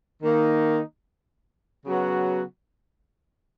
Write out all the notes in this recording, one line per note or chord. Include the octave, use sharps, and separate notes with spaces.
D#3 A#3 D#4
C#3 F#3 B3 F#4